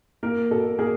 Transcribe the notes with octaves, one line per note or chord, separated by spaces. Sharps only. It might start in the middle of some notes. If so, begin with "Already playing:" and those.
A#3 A#4
B2 A4
A#3 G#4